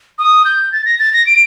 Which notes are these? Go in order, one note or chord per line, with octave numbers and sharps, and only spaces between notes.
D#6
G6
A6
A#6
A6
A#6
D7